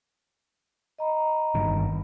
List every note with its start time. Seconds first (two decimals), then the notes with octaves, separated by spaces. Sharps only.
0.99 D#5 A#5 B5
1.55 G1 G2 D#3